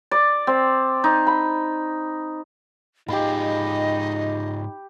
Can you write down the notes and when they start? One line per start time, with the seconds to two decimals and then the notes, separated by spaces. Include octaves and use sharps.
0.11 D5
0.47 C4
1.04 D#4
1.27 B5
3.08 G#2 D#4 F4 G4 G#4 D#5 B5